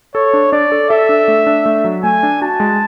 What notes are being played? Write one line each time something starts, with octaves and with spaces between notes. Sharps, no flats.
A4 C#5
D4
D4 D5
A4
A4 E5
D4
A3
D4
A3
F#3
A3 G#5
D4
F#4 A5
G#3